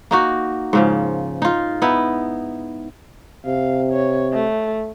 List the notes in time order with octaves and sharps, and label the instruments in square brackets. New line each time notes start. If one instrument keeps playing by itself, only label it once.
[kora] A#3 D#4 F#4
G#2 C#3 F3
D#4 F4
B3 D#4 E4
[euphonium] C3 [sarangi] F5
[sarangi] C#5
A3